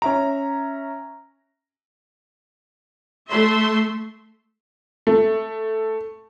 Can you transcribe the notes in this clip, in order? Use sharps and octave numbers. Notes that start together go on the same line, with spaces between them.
C#4 E5 A#5
A3 E5 C6
A3